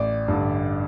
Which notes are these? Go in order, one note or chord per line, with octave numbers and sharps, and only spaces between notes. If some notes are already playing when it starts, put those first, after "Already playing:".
Already playing: A1 D5
G2 D3